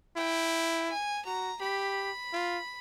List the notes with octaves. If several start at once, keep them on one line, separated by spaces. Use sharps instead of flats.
E4 G5
G#5
F#4 A#5
G4 B5
F4